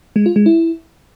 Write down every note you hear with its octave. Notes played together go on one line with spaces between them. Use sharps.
G#3
F4
G#3
E4